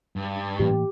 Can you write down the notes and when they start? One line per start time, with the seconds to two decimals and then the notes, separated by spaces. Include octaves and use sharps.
0.16 G2
0.59 A2 E3 A#3 G4